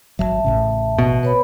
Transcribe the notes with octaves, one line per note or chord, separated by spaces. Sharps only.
G#1 D#2 F#3 E5 A5
A1 A2 C#3
B2
B4 C#5 B5